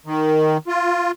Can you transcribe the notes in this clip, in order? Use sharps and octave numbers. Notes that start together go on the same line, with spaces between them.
D#3
F4